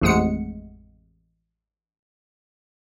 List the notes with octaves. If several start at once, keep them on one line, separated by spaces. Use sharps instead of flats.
A1 F2 G#3 A3 F#5 C#7